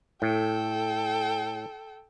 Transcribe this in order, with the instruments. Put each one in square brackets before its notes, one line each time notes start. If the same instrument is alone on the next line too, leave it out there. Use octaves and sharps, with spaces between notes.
[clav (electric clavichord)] A2 [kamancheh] A4 G5